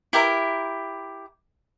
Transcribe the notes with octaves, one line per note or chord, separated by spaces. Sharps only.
E4 G4 A#4 E5